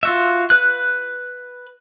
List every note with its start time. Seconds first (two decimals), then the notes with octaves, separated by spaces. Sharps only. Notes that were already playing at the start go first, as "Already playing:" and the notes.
0.03 F4 F#4 E5
0.50 B4 F#6